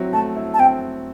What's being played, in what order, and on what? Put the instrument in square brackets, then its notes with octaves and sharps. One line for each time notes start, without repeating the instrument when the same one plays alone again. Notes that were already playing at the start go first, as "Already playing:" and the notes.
Already playing: [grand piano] F#3 C4 E4
[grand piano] A3 [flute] A5
[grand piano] E4
[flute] A5
[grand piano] C4 [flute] G5